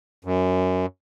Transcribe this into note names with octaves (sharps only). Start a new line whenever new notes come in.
F#2